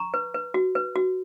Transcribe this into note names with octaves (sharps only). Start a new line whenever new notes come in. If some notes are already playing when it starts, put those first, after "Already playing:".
Already playing: A#5 C#6
B4
B4
F#4
B4
F#4